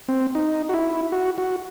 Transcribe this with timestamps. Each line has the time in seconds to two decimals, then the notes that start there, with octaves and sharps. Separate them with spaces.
0.08 C4
0.35 D#4
0.69 F#4
0.74 E4
1.12 F#4
1.38 F#4